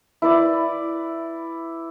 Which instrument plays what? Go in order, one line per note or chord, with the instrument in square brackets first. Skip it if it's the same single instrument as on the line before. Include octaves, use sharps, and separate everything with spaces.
[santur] E4 B4 D5